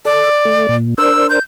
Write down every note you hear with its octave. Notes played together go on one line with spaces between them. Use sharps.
A4 D5
A3
A#2
D4 A#4 C5 E6
G6